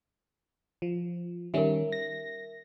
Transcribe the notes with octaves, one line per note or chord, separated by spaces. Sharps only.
F3
D#3 G3 C#4 A#4 E5
A#6